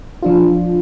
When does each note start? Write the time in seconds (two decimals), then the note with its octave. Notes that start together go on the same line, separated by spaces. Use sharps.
0.23 F3 D4 F4